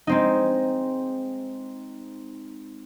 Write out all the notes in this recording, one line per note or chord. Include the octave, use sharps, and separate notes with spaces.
G#3 C4 D#4